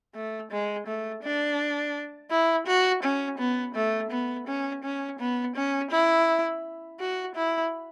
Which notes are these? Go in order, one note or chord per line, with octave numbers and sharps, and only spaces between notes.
A3
G#3
A3
D4
E4
F#4
C#4
B3
A3
B3
C#4
C#4
B3
C#4
E4
F#4
E4